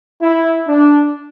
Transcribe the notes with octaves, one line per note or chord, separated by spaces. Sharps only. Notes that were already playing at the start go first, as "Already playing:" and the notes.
E4
D4